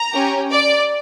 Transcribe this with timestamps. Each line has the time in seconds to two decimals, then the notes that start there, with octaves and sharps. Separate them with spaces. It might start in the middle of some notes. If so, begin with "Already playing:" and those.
Already playing: A#5
0.11 C#4 G4
0.51 D5